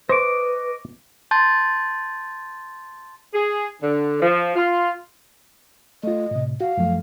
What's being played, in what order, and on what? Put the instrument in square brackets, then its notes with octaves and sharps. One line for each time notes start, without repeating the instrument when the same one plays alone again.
[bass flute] B4 [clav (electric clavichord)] C5 [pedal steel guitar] D#5 C#6 D6
[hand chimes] A5 C6 G6 A6
[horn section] G#4
D3
F3
F4
[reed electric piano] A3 F4 [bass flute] D#5
[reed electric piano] A2 C3
[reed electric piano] F#4 [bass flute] F5
[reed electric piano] F#2 F3 A3